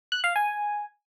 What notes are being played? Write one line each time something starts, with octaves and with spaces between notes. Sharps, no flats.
F#6
F5
G#5